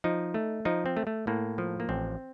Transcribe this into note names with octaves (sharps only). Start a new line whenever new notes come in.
F3 D#4
A3
F3 D#4
C4
A3
A3
A2 A#3
F3
A#3
A1 C4